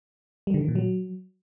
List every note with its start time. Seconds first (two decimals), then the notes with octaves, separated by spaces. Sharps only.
0.47 G3
0.54 D3
0.61 D#3
0.68 A#2
0.75 F#3